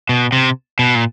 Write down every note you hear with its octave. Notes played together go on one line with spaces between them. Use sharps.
B2
C3
B2
A#2